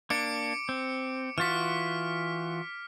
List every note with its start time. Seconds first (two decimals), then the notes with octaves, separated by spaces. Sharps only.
0.10 A#3 D4 D6 C#7 D7
0.69 C4
1.38 E3 F4 F#4 F6 B6